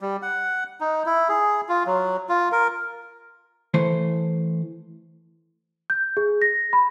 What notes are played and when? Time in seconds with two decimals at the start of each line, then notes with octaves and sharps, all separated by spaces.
0.01 G3
0.22 F#5
0.81 D#4
1.06 E4
1.29 G#4
1.69 F4
1.87 F#3
2.29 F4
2.52 A#4
3.74 E3 A3 C5
5.90 G6
6.17 G#4
6.42 A#6
6.73 B5